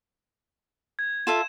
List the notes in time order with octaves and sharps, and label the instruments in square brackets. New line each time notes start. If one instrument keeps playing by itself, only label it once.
[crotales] G#6
[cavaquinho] F4 A4 E5 [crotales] E7